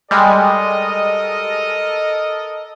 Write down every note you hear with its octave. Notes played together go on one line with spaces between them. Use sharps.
G3 G#3 A4 A#4 D#5